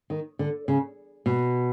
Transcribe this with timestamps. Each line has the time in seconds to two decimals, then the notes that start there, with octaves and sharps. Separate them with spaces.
0.10 D#3
0.39 D3
0.68 C#3
1.26 B2